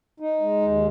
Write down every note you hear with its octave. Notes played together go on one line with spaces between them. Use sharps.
D#4
G#3
D#2